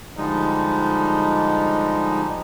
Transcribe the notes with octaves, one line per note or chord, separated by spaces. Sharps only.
D3 F3 G3 G#3 D#4